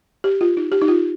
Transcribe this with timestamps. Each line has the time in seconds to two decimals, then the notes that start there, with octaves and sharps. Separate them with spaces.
0.24 G4
0.41 F4
0.57 D#4
0.72 G4
0.81 D#4
0.88 F4